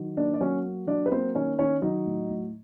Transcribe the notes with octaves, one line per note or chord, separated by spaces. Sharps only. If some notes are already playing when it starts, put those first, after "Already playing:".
Already playing: D#3 F#3
A#3 D4 D5
D5
F#3 C#4 C#5
A#3
F#3 D4 D5
B4
A#3 C4 C5
D#3 C#4 C#5
D#3 C#4 C#5
F#3 D#4 D#5
A2
A2